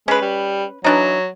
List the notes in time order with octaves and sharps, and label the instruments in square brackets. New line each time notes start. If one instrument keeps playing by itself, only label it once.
[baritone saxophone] G#3 [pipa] C#4 B4
[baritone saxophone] G3
[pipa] E3 D4 D#4 [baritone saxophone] F#3